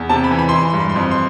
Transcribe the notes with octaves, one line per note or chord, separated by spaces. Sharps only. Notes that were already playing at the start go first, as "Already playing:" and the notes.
Already playing: E2
C3 A5
B5
E3
B5
E3 C6
B5
G2 C6
B5
C6
F2
B5
C6